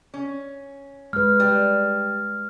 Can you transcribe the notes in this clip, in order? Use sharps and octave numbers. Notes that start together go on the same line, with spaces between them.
C#4
G#3 B4 F6
G3